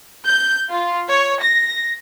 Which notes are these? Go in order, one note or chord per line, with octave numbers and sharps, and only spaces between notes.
G6
F4
C#5
A#6